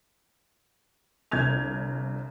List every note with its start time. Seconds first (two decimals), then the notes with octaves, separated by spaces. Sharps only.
1.31 G1 C2 G6 G#6 F7